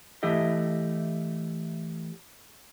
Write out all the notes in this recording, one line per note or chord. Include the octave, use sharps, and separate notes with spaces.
E3 A3 E4 G4 D#5